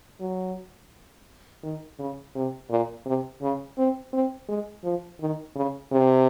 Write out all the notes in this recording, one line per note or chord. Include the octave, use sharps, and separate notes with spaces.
F#3
D#3
C#3
C3
A#2
C3
C#3
C4
C4
G#3
F3
D#3
C#3
C3